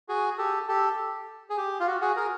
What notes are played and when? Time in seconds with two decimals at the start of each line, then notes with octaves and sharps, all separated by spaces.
0.08 F#4 G#4
0.38 G4 A4
0.68 G4 A4
1.50 G#4
1.57 G4
1.80 F4
1.87 F#4
2.01 F#4 G#4
2.16 G#4 A#4